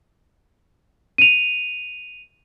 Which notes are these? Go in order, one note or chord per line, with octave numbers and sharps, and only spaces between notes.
D#7 F7